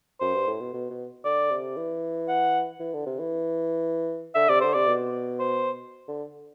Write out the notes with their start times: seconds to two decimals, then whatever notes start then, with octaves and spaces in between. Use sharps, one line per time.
0.21 F#2 C5
0.34 G2
0.47 A2
0.60 B2
0.73 B2
0.90 B2
1.25 D3 D5
1.51 C3
1.77 E3
2.29 F#5
2.80 E3
2.94 D3
3.06 C3
3.19 E3
4.35 D3 E5
4.49 C3 D5
4.61 D3 C5
4.74 C3 D5
4.88 B2
5.40 C5
6.08 D3